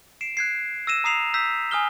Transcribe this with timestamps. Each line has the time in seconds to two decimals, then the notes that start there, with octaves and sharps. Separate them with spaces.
0.21 C7 D7 E7
0.37 F#6 G#6 C7
0.87 E6 A#6 D#7 E7
1.04 A#5 D#6 C7 F7
1.34 E6 G6 B6
1.71 G#5 D#6 F6 G7